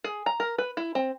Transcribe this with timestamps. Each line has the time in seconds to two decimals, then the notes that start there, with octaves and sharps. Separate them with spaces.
0.04 G#4
0.26 A#5
0.40 A#4
0.58 B4
0.77 E4
0.95 C4